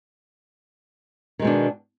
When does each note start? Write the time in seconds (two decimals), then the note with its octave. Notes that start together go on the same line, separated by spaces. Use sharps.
1.39 D#3
1.42 G#3
1.45 B2
1.47 D4